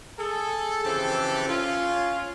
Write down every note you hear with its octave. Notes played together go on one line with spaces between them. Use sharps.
G#4 A4
C#3 E3 F3 C4 G4 A4
C#4 F4